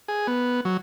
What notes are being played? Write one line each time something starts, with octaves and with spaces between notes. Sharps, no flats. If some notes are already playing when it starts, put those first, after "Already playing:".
G#4
B3
F#3